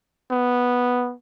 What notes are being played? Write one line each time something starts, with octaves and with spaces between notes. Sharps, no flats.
B3